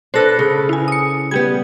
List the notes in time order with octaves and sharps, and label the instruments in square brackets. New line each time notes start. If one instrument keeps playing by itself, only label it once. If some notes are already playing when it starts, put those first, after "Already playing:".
[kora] D4 A4 B4 [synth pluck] C5 A#6
[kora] C#3
[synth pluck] E4 G#5
D#6 C#7
[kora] G3 B3 [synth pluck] G4 G#6